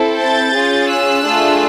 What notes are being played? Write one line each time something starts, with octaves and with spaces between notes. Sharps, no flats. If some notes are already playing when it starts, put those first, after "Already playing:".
Already playing: C4 E4 A4
G6 A6
C#4 F4 G#4
E6 F#6
A3 D4 F4 G#4